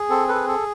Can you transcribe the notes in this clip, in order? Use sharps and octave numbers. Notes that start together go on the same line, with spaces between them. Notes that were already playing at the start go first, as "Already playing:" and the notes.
Already playing: G#4
C4 A4
A4 B4
G#4
A4